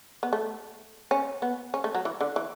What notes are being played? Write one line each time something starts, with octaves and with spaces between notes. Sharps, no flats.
B3
A3
C#4
B3
C#4
A3
F#3
E3
D3
E3